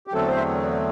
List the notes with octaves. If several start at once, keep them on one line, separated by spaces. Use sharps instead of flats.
G4
E2 D3 F#3 A3 C4 A4
C5
E5